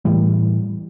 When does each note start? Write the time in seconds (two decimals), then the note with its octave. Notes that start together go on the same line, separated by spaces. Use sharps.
0.05 A2 E3 G3